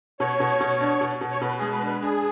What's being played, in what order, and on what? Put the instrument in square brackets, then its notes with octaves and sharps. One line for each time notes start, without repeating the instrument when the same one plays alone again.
[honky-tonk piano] B2 [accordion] C#5
[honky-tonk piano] B2
B2
D4
B2
B2
[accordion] C#5
[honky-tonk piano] B2 [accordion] B4
[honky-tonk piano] G#3 [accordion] G#4
[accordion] B4
[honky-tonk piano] D4 [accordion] B4
[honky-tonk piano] D4 [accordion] G#4